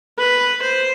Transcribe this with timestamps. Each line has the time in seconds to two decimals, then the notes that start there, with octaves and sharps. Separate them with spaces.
0.18 B4
0.62 C5